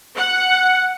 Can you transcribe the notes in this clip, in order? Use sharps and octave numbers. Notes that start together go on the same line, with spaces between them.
F#5